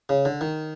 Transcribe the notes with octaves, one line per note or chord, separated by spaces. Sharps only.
C#3
D3
D#3